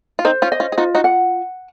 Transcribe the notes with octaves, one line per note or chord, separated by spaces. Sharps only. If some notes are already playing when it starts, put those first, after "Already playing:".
F4
C4 D#4 C5
C#4 F4
D#5
C#4 F4
G#4
D#4 F4 F#4
D#4 F#4
F#5